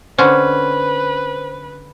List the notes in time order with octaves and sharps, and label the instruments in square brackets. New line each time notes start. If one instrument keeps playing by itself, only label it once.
[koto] D3 C4 C#4 [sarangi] B4 [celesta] C5